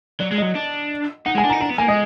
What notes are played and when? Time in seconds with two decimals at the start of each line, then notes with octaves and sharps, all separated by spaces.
0.20 F#3 D5
0.31 G#3
0.38 F#3 D#5
0.55 D4
1.26 D#4 F#5
1.35 G#3
1.38 G#5
1.44 D4
1.49 A#5
1.53 D#4
1.61 D4 A#5
1.70 B3
1.78 A#3 G#5
1.88 G#3 D#5